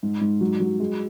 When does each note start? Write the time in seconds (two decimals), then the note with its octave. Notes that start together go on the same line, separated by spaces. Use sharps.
0.03 G#2
0.21 G#2
0.41 F#3
0.60 F#3
0.80 G#3